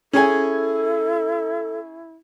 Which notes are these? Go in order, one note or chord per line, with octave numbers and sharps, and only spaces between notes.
C#4 E4 G#4 A4 G#5